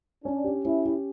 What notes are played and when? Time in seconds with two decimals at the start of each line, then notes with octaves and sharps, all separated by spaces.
0.24 C#4 D4
0.44 G4
0.65 C#4 E4
0.85 G4